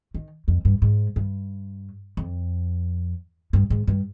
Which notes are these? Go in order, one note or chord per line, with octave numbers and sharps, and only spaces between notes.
D#3
F2
G2
G#2
G2
F2
G2
G#2
G2